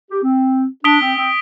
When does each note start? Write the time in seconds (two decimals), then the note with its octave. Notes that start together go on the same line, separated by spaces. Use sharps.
0.11 G4
0.23 C4
0.84 D4 D#6 B6 D7 G7
1.01 C4
1.17 C4